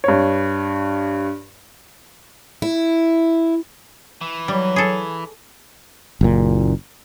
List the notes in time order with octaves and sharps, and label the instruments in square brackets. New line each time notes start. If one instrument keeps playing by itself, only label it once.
[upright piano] G2 C#5
[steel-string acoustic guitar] E4
[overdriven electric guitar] E3
[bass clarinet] F#3 [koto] G3
[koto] G#4 A4
[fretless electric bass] F#1 A#2